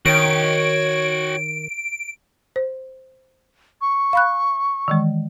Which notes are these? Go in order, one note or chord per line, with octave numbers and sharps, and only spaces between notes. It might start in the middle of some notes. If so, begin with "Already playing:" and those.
D#3 F#4 C#5 G5 D7
C5
C#6
F5 B5 F#6
D#3 E3 G#3